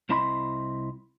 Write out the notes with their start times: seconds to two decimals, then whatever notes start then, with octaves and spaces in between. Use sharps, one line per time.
0.09 C2 C4 E4 D#5 B5 C6